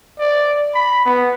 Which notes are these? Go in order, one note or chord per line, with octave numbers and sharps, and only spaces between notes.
D5
B5
B3